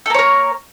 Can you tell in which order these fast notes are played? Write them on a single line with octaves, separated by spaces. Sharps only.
A4 A#3 C#5 A#4